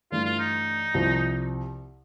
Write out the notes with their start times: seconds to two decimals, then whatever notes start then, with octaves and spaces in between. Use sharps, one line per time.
0.12 G2 E3 A3 D4 F4
0.25 F4
0.39 D#4
0.94 C2 C3 F3